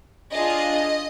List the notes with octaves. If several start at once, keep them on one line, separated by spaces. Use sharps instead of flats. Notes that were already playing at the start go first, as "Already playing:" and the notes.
D4 F4 G#4 D#5